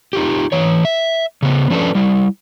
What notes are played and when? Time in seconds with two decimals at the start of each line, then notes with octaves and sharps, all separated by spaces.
0.13 D#4 F4 G4
0.52 E3 C#5
0.85 E5
1.42 C#3 B3
1.70 F3 C#4 D4 A4 B4
1.95 G3 E4